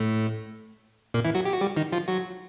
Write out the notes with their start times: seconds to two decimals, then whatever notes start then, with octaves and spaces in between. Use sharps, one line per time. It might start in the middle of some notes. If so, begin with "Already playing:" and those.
Already playing: A2 A3
1.14 A#2 A#3
1.25 E3 E4
1.35 F#3 F#4
1.45 G4
1.53 F#4
1.61 G3 G4
1.77 D#3 D#4
1.92 F3 F4
2.08 F#3 F#4